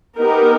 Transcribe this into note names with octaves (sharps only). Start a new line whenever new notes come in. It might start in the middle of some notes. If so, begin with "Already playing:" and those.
B3 D#4 G4 A#4